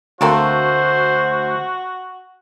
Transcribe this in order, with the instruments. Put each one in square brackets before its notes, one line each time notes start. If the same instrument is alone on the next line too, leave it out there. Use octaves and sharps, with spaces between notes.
[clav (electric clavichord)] D2 [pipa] A3 A#3 C4 [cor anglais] F#4 [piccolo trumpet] C5